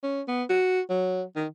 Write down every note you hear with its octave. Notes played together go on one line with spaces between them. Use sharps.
C#4
B3
F#4
F#3
D#3